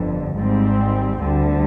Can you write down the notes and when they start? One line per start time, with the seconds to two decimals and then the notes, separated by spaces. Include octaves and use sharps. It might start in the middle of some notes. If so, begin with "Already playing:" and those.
Already playing: G1 F2 D3
0.36 G#1 G#2 G3 C4
1.21 D2 D3 G3